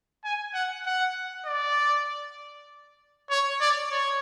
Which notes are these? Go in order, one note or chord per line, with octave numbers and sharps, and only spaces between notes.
G#5
F#5
F#5
D5
C#5
D5
C#5